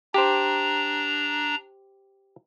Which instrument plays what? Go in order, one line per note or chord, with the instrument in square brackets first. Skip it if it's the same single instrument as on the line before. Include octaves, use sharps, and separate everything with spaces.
[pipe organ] D4 A#5 [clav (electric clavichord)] G4 C5